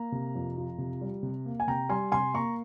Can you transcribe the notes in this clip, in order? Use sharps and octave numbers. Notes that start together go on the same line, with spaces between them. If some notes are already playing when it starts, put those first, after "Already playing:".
Already playing: A#3 A#5
C3
F2
F3
C3
G3
C3
A#3
G#5
C3 G5 A#5
G3 G#5 C6
C3 G#5 C6
A#3 A#5 C#6